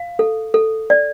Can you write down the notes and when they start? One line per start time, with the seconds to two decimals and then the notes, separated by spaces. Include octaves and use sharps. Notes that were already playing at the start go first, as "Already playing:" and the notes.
Already playing: F5
0.19 A4
0.54 A4
0.90 D5